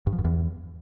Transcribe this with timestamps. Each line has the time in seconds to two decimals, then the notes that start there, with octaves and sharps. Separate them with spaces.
0.07 G2
0.13 F3
0.19 F#2
0.24 E2